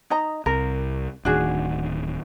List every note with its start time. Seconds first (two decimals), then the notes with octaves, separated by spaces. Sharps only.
0.10 D#4 D#5 A#5
0.46 C2 A#4
1.25 D1 D#3 D4 F#4 G#4